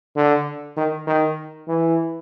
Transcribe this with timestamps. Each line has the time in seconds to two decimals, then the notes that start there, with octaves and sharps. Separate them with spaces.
0.16 D3
0.77 D#3
1.07 D#3
1.68 E3